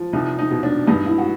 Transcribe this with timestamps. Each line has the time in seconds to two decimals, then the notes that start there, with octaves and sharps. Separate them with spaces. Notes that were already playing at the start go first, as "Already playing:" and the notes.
Already playing: F3
0.13 C2 D#4
0.39 D#4
0.51 B2
0.63 D4
0.87 G2 D#4
1.06 E4
1.18 F#4